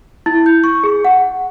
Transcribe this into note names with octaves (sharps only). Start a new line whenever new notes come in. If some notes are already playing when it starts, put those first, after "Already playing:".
E4
G6
C#6
G#4
F#5